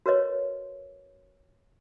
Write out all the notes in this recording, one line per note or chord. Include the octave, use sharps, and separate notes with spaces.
F#4 A#4 B4 C#5 D#5